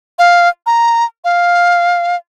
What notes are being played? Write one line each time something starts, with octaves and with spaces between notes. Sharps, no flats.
F5
A#5
F5